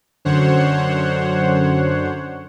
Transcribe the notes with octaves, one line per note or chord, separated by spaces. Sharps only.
F#2 D3 C5 C#5 F#5